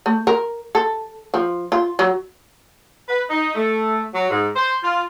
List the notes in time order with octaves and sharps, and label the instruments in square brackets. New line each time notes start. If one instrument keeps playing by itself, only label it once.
[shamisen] A3
A#4
A4
F3
F4
F#3
[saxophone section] B4
D#4
A3
F#3
G#2
C5
F4